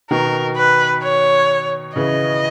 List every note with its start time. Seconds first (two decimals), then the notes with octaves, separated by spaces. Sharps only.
0.11 B2 D#3 A#4
0.57 B4
1.03 C#5
1.96 C#3 E3 D#5